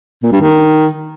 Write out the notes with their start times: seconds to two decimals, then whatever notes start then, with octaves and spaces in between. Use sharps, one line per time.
0.23 A#2
0.32 G2
0.41 D#3